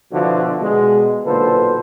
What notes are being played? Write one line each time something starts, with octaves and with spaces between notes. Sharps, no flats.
B2 D3 F3 D4 E4 F#4
B2 G#3
B1 A#2 D3 A4 B4 C5